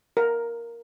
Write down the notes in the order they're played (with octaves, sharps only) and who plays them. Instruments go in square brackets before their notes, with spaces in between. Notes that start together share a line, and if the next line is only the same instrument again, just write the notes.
[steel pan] A#4